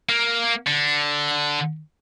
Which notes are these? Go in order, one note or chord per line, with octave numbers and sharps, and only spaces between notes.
A#3
D3